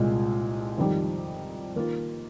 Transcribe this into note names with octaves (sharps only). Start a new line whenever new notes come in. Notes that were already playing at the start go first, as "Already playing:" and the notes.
Already playing: C2 A#2 G#3
F2 D#3 G3
D#3 A#3 F4